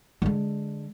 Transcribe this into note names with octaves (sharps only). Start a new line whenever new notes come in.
D3 G#3